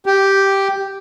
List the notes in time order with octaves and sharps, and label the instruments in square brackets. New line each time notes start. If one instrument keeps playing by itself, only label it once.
[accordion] G4